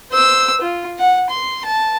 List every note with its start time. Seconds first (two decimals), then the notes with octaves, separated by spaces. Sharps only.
0.12 C5 E6
0.61 F4
0.99 F#5
1.30 C6
1.65 A5